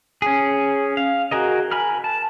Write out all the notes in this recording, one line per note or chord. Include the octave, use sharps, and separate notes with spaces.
C#4 G#4
F5
F#4 G#4 A#4 D#5
A#4 G#5 B5 F6
A5